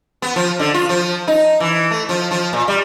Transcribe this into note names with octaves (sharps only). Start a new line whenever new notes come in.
B3
F3
D3
F4
F3
D#4
E3
A3
F3
F3
A#2
G3